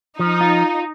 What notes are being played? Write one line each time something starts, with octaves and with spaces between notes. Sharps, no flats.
F3 D#4
F4